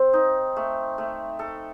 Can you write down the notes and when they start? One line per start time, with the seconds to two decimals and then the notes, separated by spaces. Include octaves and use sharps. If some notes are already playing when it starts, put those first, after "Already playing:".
Already playing: C4
0.13 D#4
0.57 A3
0.98 A3
1.39 A4